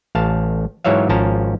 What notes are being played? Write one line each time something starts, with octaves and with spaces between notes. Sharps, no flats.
A1 F5 A5
G#2 E3 F#3 C#5 E5 F5
G#1 F3 C#4 A5 A#5